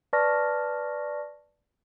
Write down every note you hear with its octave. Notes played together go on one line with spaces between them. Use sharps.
B4 D5 A5 C#6 F6 A#6